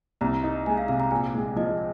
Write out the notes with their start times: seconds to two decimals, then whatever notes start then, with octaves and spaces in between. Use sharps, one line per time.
0.21 C2 A#5
0.43 D#4
0.66 G#3 G#5
0.78 F5
0.88 C3 F5
1.00 A#5
1.11 A#1 G#5
1.34 G#3
1.56 F3 D#5